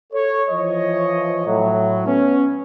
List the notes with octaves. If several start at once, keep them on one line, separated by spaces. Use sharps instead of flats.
A4 C#5
E3 F3 C#5 D#5
A2 F#3
B3 C#4